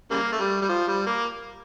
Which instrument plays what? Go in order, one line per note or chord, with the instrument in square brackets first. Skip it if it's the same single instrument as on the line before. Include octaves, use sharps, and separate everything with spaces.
[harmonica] C#3 G3 A#3
A3
G3
G3
F3
G3
A#3